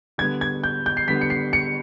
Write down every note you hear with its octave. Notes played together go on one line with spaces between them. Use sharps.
D3 G3 B3 G#6
G#6
G6
G6
C7
D3 G3 B3 B6
C#7
C7
C#7